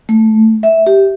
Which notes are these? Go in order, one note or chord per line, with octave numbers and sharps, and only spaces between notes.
A3
E5
G4